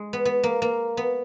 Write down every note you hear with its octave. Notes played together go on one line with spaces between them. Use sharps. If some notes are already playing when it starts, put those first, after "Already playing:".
Already playing: G#3
B3
B3
A#3
A#3
B3